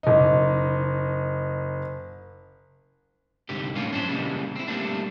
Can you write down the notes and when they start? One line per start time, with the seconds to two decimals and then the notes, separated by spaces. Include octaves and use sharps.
0.03 F#1 D#4
3.49 C2 G#2 D3 G4
3.75 A2 A#3 C#4 F4
3.91 F#2 C#4 D4 C5
4.08 A#2 C#3 E3 G3 G#3
4.56 C4 E4
4.67 G3 A3 A#3 C4 D4